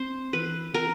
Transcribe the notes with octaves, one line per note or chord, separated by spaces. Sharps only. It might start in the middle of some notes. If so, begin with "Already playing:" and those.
Already playing: C4 C5
E3 B4
E3 A#4